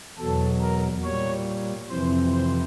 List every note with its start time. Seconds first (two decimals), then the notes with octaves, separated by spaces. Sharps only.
0.18 E2 B2 F#3 A4
0.61 A#4
1.04 A#2 G3 C#5
1.90 F2 C3 E3 C5
2.32 C5